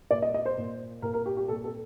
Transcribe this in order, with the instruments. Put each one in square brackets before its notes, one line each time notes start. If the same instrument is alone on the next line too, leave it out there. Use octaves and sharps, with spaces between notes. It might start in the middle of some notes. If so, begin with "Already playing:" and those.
[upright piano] A#2 D5
D#5
D#5
C5
A#2
A#2 A#4
A#4
G4
G4
A#2 A4
A4